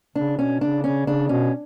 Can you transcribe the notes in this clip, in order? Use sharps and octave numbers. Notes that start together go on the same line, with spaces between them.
C#3 D4
B2 C#4
C#3 D4
C#3 C#4
C#3 D4
B2 C#4